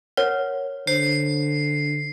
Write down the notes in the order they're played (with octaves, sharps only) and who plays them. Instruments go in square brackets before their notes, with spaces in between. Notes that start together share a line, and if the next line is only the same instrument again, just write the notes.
[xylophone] A#4 [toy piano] C#5 F#5
[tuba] D3 [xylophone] C5 [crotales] C7